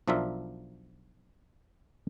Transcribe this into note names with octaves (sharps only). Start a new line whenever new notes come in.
B1 F3 D4 F4 A#4 E5